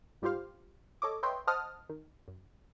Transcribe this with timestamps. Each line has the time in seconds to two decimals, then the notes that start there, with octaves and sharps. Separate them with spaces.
0.22 G#2 G3 F4 G4 C5 F5
1.02 A4 C#5 D#5 D6
1.23 B4 C#5 D#5 E5 G5 C6
1.47 C5 D#5 F#5 A5 D#6 F6
1.89 D#3
2.28 F#2